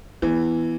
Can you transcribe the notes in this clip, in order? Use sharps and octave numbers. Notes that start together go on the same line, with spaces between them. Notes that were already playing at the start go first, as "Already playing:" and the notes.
E3 B3